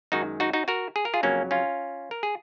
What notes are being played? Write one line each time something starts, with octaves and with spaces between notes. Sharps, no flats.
F#2 D#3 G#3 D#4 F#4
D#4 F#4
D#4 F#4
F#4 A#4
G#4
A#4
F4 G#4
F2 C#3 F#3 A#3 C#4
C#4 F4
A#4
G#4